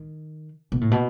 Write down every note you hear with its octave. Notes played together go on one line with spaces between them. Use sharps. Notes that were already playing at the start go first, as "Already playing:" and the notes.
Already playing: D#3
B2
A2
B2